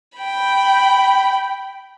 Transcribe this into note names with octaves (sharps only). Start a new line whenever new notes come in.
G5 B5